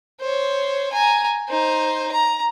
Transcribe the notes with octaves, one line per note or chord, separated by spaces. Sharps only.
C5 C#5
G#5 A#5
D#4 C5
A#5